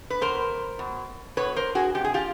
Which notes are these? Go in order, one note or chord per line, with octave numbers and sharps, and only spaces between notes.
B4
B2 A#4 C5
B2
B2 B4 C#5
A#4 C5
F#4 G#4
C3 G4
G#4
F4 G4